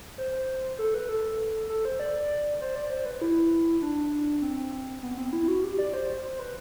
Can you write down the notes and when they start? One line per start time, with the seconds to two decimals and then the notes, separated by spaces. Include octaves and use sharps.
0.18 C5
0.79 A4
0.94 B4
1.09 A4
1.69 A4
1.85 C5
1.99 D5
2.61 C5
2.75 D5
2.90 C5
3.05 B4
3.21 E4
3.82 D4
4.42 C4
5.03 B3
5.18 C4
5.33 E4
5.48 F#4
5.64 G4
5.79 D5
5.94 C5
6.24 C5
6.39 B4